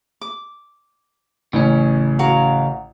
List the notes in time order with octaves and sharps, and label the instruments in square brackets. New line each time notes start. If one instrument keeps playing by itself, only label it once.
[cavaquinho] D6
[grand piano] A1 [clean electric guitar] C#3 C#4
[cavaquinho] F#4 A#4 F5